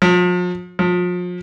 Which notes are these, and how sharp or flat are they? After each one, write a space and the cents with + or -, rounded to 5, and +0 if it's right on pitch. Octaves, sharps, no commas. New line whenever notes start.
F3 +40
F3 +35